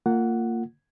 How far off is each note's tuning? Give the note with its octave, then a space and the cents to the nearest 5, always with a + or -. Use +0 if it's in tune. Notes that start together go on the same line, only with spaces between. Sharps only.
A#3 -25 F4 +0 F#5 +0